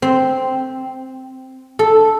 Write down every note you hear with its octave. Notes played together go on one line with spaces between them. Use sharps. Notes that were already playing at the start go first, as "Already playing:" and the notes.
C4
A4